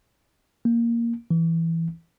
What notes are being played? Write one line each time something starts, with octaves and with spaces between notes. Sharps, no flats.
A#3
E3